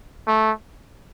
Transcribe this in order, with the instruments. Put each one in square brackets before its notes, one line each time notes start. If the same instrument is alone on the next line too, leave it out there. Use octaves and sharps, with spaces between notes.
[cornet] A3